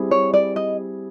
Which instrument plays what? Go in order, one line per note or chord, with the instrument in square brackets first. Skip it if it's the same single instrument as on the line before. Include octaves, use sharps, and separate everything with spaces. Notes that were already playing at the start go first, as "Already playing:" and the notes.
Already playing: [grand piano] G3 C4 E4 G#4
[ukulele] C#5
D5
D#5